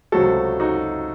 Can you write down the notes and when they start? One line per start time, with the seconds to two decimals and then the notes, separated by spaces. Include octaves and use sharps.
0.12 C#2 C3 F#3 A3 C4 F#4 A4
0.60 D#4 F#4